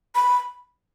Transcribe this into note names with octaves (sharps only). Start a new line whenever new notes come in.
B5